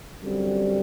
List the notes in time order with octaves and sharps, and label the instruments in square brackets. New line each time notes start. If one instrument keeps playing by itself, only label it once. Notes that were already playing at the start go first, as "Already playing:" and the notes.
[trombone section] F#2 D3 G3 C4